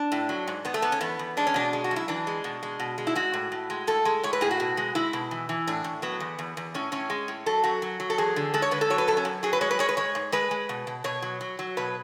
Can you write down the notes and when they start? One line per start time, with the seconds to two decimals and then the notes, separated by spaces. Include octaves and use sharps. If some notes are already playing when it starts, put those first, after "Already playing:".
Already playing: D4
0.12 A2
0.29 F#3
0.47 G#2
0.65 G#2 B3
0.74 A3
0.82 G#2 B3
0.92 C#4
1.01 E2 B3
1.19 E2
1.37 G#3 D4
1.47 C#4
1.54 B2 D4
1.73 G#3
1.84 F#4
1.91 F#2
1.96 E4
2.08 E3 D4
2.27 G#3
2.44 B2
2.63 G#3
2.79 B2
2.98 G#3
3.07 E4
3.15 G#3 F#4
3.33 A2
3.52 A2
3.70 G#3
3.87 A2 A4
4.05 G#3
4.23 A2 C#5
4.33 B4
4.41 A2 G#4
4.51 F#4
4.60 B2
4.77 G#3
4.95 G#3 E4
5.13 B2
5.31 E3
5.49 E3
5.67 A2 D4
5.84 A2
6.02 F#3 B3
6.20 E2
6.39 E2
6.57 E2
6.74 A2 C#4
6.92 A2 C#4
7.10 G#3
7.28 A2
7.46 F#3 A4
7.64 F#2 F#4
7.82 F#3
8.00 F#3
8.10 A4
8.18 E2 G#4
8.36 D3
8.54 G#3 A4
8.62 C#5
8.71 D3 B4
8.81 A4
8.90 F#3 C#5
8.98 B4
9.08 F#2 A4
9.17 C#4
9.25 F#2
9.43 F#3 G#4
9.53 B4
9.61 G#3 C#5
9.71 B4
9.79 G#3 C#5
9.89 B4
9.97 G#3 C#5
10.15 G#2
10.32 G#3 B4
10.51 G#3
10.69 B2
10.87 B2
11.04 B2 C#5
11.22 F#3
11.41 F#3
11.59 F#3
11.77 B2 B4